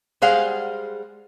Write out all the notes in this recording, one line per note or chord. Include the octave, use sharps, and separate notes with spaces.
G3 G#3 G#4 C5 F5 F#5